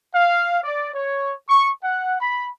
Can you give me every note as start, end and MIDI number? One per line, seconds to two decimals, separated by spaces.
0.15 0.60 77
0.64 0.90 74
0.94 1.33 73
1.49 1.71 85
1.84 2.17 78
2.21 2.48 83